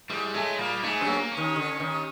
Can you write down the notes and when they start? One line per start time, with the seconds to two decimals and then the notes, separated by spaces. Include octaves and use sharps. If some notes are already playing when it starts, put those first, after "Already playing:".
0.09 G#2 G3 G#3
0.34 A2 G#3 A3
0.58 A#2 G3 A#3
0.83 G#2 G#3 A3
1.01 F#2 F#3
1.07 A#3
1.32 C#4
1.37 D#2 D#3
1.56 D3
1.80 D#2 D#3